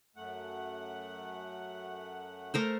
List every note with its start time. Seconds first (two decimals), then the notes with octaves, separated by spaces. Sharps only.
0.16 F#2 A3 F#5
2.54 A3 A#4 C5